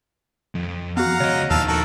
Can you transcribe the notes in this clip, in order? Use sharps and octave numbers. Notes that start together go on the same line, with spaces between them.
F2
B3 F#4 F5 F#5 A#5
C#2 C#5 D#5
D#2 D#3 F3 F5 A5 E6
F#4 A4 A#4